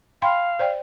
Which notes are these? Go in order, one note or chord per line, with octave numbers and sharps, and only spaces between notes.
F5 G5 B5 C6
C5 D5 G5